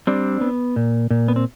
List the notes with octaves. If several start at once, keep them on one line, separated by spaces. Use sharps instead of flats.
G3 C4 D4
B3
A#2
A#2
B3
C4